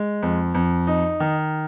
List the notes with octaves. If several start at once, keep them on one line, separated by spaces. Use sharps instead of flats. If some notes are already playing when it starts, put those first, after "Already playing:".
Already playing: G#3
F2
F2
D#4
D#3